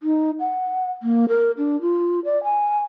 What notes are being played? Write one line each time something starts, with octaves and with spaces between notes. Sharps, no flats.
D#4
F#5
A#3
A#4
D4
F4
D5
G#5